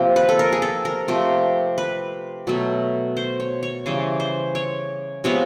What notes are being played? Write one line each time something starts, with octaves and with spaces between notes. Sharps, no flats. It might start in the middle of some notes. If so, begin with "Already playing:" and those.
Already playing: C3 F3 A#3
B4
A4
A#4
G#4
A4
A#4
C3 F3 A3
B4
B2 F#3 A3
C5
C#5
C#5
C#3 E3 G3 C5
C5
C#5
C3 F3 G#3 B3 C#5